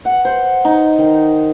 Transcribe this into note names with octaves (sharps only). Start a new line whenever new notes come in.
F#5
C5
D#4
D#3